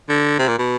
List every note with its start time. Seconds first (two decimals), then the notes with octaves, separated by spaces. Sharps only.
0.09 D3
0.39 C3
0.48 A#2
0.58 B2